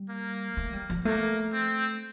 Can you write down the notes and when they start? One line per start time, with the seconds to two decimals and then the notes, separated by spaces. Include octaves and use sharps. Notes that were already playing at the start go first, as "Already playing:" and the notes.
Already playing: G3
0.09 A#3
0.57 A3
0.73 G3
0.90 F3
1.05 A3 A#3
1.53 C4